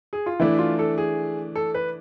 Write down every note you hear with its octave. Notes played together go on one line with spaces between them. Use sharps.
G#4
F4
E3 A3 D4 E4
F4
A4
G#4
A4
B4